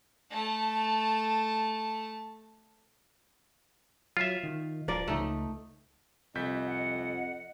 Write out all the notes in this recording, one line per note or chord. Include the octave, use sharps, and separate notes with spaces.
A3 A5
F#3 F4 E5
D#3
D1 F3 A#4 D5
C#2 A3 D#4
C2 F2 D#5 G6 B6
F#5